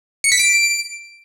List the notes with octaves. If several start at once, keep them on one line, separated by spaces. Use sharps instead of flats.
C#7
B6
D7